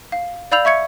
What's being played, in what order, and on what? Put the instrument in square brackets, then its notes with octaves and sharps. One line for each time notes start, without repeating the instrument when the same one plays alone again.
[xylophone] F5
D5 F5 B5 E6 G6 F7
E5 C#6 G#6 C#7